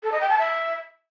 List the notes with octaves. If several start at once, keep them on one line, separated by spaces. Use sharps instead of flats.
A4
D#5
G5
A5
E5